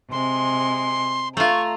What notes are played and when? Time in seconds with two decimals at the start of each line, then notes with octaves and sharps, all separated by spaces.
0.12 C3 G#3 C6
1.37 A3 F4 A#5 C#6